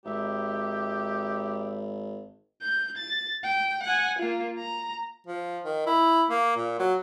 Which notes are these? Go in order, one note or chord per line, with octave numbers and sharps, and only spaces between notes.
G#1 D#4 G4 E5
G6
A6
G5
F#5 G#5
A#3 F4
A#5
F3
D#3
E4
A#3
A#2
F#3